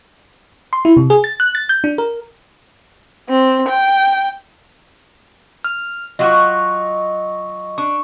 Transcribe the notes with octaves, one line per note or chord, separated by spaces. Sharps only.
C6
E4
C3
G#4
A6
F#6
A6
G6
D4
A#4
C4
G5
F6
F#3 F4 F#4 D#5 C#6
D4 C#6